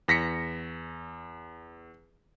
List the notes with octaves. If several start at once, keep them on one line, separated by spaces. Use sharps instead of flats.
E2 A#6 B6 C#7